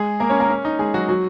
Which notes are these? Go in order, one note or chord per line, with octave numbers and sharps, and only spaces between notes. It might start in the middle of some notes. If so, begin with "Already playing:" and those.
Already playing: G#3 G#4
A#3 A#4
C#4 C#5
A#3 A#4
C#4
D#4
G#3 G#4
F#3 F#4
F#3 F#4